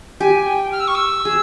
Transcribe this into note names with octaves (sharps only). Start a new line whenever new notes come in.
G4 G#5
G5
F6
E6
C#6
E6
G#4